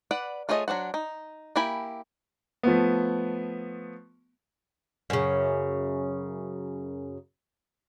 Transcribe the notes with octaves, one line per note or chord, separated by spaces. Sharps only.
B4 D5 F#5
A3 F4 G#4 C#5 D#5
F#3 D4 C5 F#5
D#4
A#3 E4 G4 G#5 B5
F3 A3 B3
F#2 C#3